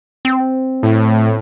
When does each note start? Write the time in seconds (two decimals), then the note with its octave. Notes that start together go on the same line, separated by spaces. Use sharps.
0.25 C4
0.83 A2